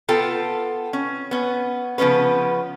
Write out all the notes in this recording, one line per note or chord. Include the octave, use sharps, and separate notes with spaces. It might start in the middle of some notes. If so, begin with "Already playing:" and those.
B3 F4 A4 G5
C#4
B3 C#4
C#3 F3 B3 C#4 B4